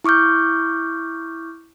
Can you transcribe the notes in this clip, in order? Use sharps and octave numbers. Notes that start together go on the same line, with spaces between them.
E4 C#6 D6 F6 G6